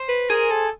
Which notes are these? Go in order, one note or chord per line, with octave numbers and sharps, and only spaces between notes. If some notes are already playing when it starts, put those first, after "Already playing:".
Already playing: C5
B4
G#4 A#4
A4